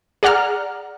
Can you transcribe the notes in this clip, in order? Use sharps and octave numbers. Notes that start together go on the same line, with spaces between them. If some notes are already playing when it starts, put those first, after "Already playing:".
G#4 D5 F#5 A#5 F6